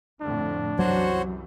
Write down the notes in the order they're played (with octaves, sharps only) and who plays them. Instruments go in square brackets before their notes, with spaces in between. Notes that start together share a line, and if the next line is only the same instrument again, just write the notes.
[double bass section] F2 A2 D3 [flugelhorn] D4
[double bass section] C2 F#2 E3 [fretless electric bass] F#3 [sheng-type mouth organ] F#4 C5 C#5